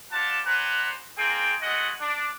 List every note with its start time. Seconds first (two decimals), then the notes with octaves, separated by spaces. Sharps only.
0.12 F4 G4 D5 F#5 A5
0.46 B4 C5 D5 F#5 G#5 A#5
1.18 A#3 C4 F4 G#4 G5
1.62 G#3 A3 F#4 D#5 F#5
2.01 D4